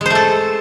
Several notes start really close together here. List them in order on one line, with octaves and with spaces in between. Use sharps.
G#3 C5 A3 A4